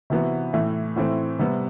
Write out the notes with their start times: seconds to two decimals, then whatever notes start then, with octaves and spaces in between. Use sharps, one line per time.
0.10 C3 E3 B3 F#4
0.53 A2 E3 A3
0.96 A2 E3 A3 C4
1.39 C3 G3 B3